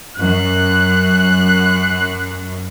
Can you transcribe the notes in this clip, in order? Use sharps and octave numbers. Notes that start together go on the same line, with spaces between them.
F#2 F#6